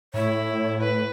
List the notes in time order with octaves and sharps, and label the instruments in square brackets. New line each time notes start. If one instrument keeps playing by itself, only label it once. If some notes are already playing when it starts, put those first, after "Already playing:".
[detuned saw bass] A2 [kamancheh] E4 [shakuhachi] C#5
[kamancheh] B4